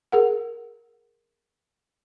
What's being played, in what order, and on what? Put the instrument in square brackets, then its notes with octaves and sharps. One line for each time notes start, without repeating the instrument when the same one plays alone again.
[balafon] G#4 A#4 F#5